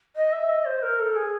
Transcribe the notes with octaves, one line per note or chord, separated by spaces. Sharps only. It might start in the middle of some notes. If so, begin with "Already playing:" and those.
D#5
E5
D#5
C5
A#4
A4
G#4